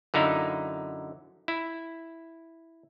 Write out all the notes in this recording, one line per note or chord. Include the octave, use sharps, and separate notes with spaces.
F#2 D3 D#4 E4 F5
E4